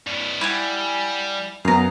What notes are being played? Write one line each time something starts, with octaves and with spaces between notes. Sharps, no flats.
G2 E4
G3 E4 F#5 G#5
F#2 B3 F5 A#5